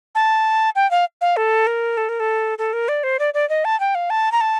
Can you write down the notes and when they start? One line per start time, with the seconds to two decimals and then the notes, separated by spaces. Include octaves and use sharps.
0.15 A5
0.75 G5
0.91 F5
1.21 F5
1.37 A4
1.67 A#4
1.97 A4
2.09 A#4
2.20 A4
2.58 A4
2.73 A#4
2.88 D5
3.03 C5
3.19 D5
3.34 D5
3.49 D#5
3.65 A5
3.80 G5
3.95 F5
4.10 A5
4.32 A#5
4.41 A5